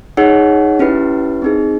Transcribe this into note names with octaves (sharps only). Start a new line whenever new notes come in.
D#4 G#4 C#5 F#5
C#4 E4 G4 B4
C4 D#4 G#4